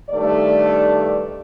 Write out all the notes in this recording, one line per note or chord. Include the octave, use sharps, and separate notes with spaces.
G2 D#3 A3 D5